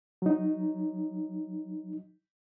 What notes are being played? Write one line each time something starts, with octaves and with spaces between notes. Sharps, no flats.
F#3 D#4